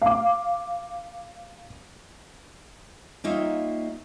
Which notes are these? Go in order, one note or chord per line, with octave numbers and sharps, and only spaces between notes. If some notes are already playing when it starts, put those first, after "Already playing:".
F5 D6
G3 A#3 D#4 F4 C#5 E5